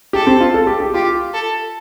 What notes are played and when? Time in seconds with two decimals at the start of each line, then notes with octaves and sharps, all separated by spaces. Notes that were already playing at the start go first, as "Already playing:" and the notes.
0.13 G4 A4
0.27 C4
0.40 F4
0.54 A4
0.67 G4
0.80 G4
0.94 F4 G4
1.34 A4